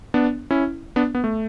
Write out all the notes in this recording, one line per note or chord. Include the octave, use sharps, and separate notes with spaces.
B3 D4
C#4 E4
B3 D4
B3
A3